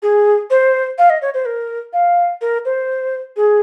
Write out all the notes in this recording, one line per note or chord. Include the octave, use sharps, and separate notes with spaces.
G#4
C5
F5
D#5
C#5
C5
A#4
F5
A#4
C5
G#4